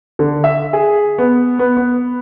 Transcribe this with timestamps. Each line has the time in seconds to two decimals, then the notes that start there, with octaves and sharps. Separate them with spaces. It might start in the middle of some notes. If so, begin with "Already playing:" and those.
0.19 D3
0.44 E5
0.73 G#4
1.18 B3
1.59 B3
1.77 B3